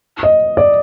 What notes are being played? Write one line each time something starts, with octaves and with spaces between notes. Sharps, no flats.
D#5
D5